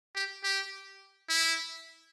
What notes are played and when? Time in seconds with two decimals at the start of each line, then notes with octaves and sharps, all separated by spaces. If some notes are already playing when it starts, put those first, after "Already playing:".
0.15 G4
0.44 G4
1.29 E4